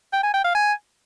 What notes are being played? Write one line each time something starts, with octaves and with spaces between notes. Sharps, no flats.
G5
G#5
G5
F5
G#5